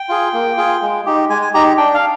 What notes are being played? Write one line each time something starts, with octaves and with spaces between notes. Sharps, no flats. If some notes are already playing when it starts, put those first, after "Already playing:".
Already playing: G5
F4 G#4
A#3
F4 G#4
G#3
D#4 G4
G#3 G#5
G#5
D#4 G4 A#5
D4 G5
F5